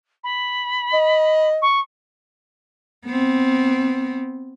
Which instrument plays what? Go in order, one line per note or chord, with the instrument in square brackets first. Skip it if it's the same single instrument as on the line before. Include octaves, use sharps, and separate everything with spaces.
[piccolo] B5
[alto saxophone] D#5
[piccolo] C#6
[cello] B3 C4